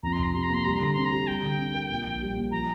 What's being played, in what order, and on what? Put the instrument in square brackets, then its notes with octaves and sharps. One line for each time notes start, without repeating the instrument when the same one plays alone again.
[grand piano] F2 [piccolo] A#5
[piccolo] C6
[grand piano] F1 [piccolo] A#5
[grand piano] C3 [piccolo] C6
[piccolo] A#5
[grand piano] A#3 [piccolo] C6
[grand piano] G3 [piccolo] A#5
[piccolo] C6
[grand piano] D3 [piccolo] A#5
[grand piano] C4 [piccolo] C6
[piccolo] A#5
[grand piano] G4
[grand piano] G3 [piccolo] G5
[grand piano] D3
C4
A#4
A#2
A#1
G3
A#3
[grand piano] F3 [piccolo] A#5